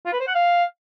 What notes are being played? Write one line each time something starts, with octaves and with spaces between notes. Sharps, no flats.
F4
B4
C5
F#5
F5